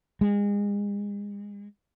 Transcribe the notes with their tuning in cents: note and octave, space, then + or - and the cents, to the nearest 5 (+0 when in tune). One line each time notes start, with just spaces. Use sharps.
G#3 -35